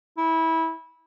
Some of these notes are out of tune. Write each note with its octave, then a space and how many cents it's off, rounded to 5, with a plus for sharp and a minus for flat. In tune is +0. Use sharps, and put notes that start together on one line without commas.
E4 -20